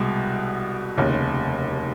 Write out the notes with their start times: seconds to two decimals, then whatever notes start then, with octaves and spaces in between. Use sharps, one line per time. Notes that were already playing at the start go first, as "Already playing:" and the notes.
Already playing: C2 B2 G#3
0.97 F1 D#2 C#3